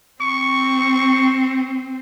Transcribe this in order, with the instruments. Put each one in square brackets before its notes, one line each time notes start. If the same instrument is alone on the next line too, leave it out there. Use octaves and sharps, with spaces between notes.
[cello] C4 [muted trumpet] C#6